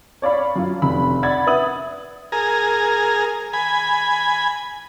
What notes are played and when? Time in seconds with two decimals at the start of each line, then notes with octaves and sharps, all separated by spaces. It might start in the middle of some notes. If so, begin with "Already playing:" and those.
0.22 C#5 D5 F5 B5
0.56 F#2 F4
0.82 F1 B5
1.23 D5 F#5 B5 G#6 A6
1.47 B4 E5 D#6 F#7
2.32 G#4 A#4
3.53 G#5 B5